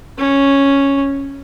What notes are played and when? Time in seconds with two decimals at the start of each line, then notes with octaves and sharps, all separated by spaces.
0.18 C#4